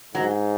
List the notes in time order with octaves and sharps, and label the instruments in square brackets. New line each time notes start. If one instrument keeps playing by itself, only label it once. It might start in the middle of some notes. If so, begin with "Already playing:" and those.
[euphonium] G#2 [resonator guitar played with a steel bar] F#3